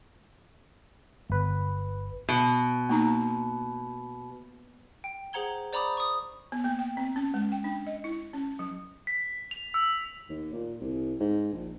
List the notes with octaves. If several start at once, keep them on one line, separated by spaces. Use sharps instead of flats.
G1 B4
B2
A#3 D#4 A#5
G5
G#4 C5 F#5 A#5 G#6 G7
C5 D5 A#5 B5 D6 D#6
C#6 D#6
B3
A#3
G5
C4
C#4
G#3
G5
D4
D#5
E4
C#4
F#3
B6
F7
E6
D#2
A#2
C2
G#2
A#1